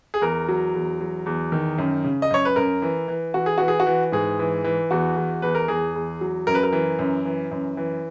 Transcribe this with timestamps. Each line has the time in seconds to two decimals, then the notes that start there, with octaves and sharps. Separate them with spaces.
0.14 G#4
0.21 E2 A#4
0.49 F#3
0.74 E2
1.01 F#3
1.26 E2
1.52 D#3
1.78 F#2
2.04 C#3
2.22 D#5
2.30 F#2 C#5
2.45 B4
2.56 F#2 A#4
2.82 E3
3.08 E3
3.34 E3 F#4
3.46 G#4
3.58 E3 F#4
3.68 G#4
3.80 F#4
3.86 E3
4.12 G#2 G#4
4.39 E3
4.64 E3
4.91 E2 F#4
5.16 E2
5.42 E2 B4
5.55 A#4
5.68 E2 G#4
5.96 E2
6.21 F#3
6.47 F#2 A#4
6.55 B4
6.63 A#4
6.72 E3
6.99 F#2
7.25 E3
7.51 F#2
7.77 E3